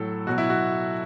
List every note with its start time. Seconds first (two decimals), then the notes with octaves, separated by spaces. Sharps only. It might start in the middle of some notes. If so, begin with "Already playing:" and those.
Already playing: A2 F#3 A4
0.27 B2 F#3 F#4
0.38 E4
0.49 F#4